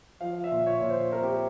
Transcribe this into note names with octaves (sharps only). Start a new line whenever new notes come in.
F3 F5
E5
A#2
C#5
A#2
C5
C4 A#4
G4